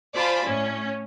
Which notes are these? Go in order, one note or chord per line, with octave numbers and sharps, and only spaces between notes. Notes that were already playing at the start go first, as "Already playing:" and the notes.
F4 C5 D5 G#5 A5 B5
A2 C#4